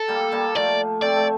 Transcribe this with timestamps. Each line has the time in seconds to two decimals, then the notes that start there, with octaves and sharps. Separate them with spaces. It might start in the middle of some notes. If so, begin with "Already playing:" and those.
Already playing: A4
0.08 G3 A#3
0.32 G3 A#3
0.55 F3 A3 D5
1.02 A3 C4 D5
1.16 A3